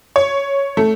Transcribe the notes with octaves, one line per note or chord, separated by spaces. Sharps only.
C#5
A3